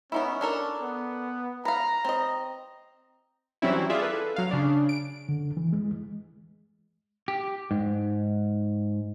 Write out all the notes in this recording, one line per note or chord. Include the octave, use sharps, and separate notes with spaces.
B3 C#4 D#4 E4
D4 A4 A#4
B3
B4 F5 A#5
C4 D#5
E3 F#3 G3 C4 C#4 E4
F4 G#4 D5 E5
A4 B4
F#3 F5
C#3 D4
D7
D3
E3
G#3
G4
G#2